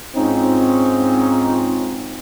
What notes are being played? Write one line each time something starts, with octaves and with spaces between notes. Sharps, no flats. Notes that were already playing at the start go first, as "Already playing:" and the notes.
G#2 C4 C#4 D#4 F4